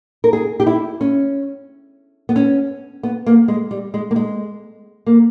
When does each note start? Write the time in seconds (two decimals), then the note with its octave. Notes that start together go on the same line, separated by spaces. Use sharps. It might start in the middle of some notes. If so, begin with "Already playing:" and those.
0.24 A#4
0.33 G#4
0.60 G4
0.67 E4
1.01 C#4
2.29 B3
2.36 C#4
3.03 B3
3.26 A#3
3.48 G#3
3.71 G3
3.94 G#3
4.11 A#3
4.16 G#3
5.06 A#3